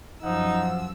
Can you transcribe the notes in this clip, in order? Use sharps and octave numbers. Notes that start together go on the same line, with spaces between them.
F#2 F3 D#4 F#5 E6